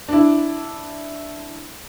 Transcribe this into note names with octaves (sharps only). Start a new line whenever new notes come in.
D4 E4